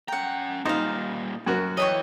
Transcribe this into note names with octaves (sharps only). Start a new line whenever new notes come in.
C#4 F#5 G5 A#5
A#2 G3 D#4 C5 F5
F#2 F#4 A#4
E3 C#5 D#5 G5 C#6